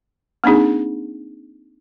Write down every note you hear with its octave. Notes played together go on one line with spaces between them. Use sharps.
A#3 C4 D4 D#4 G#4